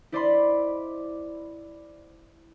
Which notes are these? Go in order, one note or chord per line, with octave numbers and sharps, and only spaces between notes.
E4 C5 D5 D#5 B5 C6